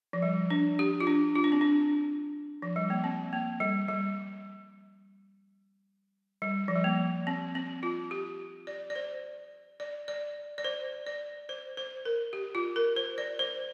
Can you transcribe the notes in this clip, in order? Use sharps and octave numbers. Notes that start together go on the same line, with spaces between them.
F3
G3
D4
G4
F4
D4
F4
D4
C4
D4
F3
G3
A#3
C4
A#3
G3
G3
G3
F3
G3
A#3
C4
C4
F4
G4
D5
D5
C5
D5
D5
D5
C5
D5
C5
C5
A#4
G4
F4
A#4
C5
D5
C5